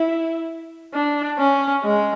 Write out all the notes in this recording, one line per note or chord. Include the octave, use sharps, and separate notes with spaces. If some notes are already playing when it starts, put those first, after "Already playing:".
Already playing: E4
D4
C#4
G#3